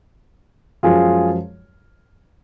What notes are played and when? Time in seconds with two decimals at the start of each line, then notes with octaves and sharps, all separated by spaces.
0.83 F#2 F3 G#3 F4 G#4